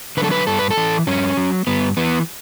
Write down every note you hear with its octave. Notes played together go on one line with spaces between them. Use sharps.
D3 B4
F#3 A4
B4
G2 A4
B4
A4
E3
G2 C#4
F#3
G2 B3
E3 B3